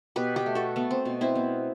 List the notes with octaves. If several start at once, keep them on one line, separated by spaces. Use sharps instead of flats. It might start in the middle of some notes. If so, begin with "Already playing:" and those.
B2 G4 B4
G4 B4
A3
F#4 A4
A3 B3
C4
B2
C4 E4
B3